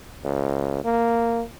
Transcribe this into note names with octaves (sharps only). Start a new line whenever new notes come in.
C#2
A#3